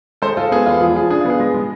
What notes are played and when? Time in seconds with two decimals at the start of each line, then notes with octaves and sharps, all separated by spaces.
0.22 G#3 A4 C5
0.37 G#3 F4 A4
0.51 B3 G#4
0.66 E2 F4
0.81 F3 G#4
0.96 F3 G#4
1.10 D4 G#4
1.21 F4
1.25 B3 G#4
1.40 G#3
1.54 G#3